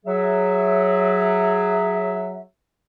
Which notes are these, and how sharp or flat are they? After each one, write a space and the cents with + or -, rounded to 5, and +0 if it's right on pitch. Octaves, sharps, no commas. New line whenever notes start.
F#3 +0 G#4 +0 E5 +0